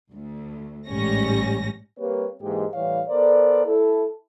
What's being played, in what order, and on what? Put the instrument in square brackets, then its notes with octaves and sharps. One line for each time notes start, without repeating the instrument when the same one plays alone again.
[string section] D2
A1 G#2 G3 C#4 A#6
[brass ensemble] G3 A#3 C4 G4 B4 C#5
G#2 E3 G#3 A#3 G4
A2 E3 G3 C#5 F5
B3 A4 A#4 C5 D5
E4 A4